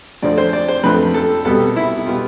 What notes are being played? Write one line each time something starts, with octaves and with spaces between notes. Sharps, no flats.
F2 D3 F3 A3 C4 D5
C5
D5
C5
F2 D3 F3 A3 C4 B4
A4
C2 B2 G3 B3 A4
E4
B2 G3 B3 F4